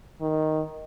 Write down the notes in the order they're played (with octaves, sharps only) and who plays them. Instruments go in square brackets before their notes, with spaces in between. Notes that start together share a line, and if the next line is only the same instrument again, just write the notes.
[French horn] D#3